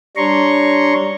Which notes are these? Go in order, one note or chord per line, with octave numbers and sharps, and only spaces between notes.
G3 D4 C#5 A#5 C6 C#6